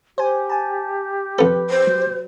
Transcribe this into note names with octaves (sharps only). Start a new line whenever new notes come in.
G4 C5 G#5
G#5 A5
F2 A4 B4
C5
F#3